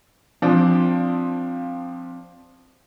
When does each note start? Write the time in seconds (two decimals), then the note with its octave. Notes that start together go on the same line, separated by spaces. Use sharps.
0.42 F3 C4 D4 F4